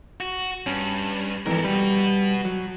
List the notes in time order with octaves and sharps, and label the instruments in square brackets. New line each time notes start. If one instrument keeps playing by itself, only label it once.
[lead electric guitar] F#4
[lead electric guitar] G2 [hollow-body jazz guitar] C#4
[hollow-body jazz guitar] F2 G#2 E3 [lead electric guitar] A4 A#4
[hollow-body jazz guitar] G3 [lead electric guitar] F#4 B4
[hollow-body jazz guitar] F#3